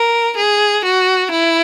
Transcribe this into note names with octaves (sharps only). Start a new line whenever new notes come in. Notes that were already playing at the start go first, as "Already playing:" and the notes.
Already playing: A#4
G#4
F#4
E4